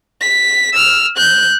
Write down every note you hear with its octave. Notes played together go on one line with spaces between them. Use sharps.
B6
E6 F6
F#6 G6